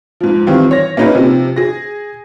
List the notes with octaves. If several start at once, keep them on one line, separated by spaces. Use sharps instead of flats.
G#2 F3
D#3 E3 G3 C4 F4
C#5 A#6
A#3 C#4 D#4 G#4 B4
C3 F3
G#4 A#6